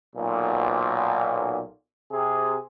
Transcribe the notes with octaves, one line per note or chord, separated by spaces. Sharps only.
B1 A#2
C3 G#4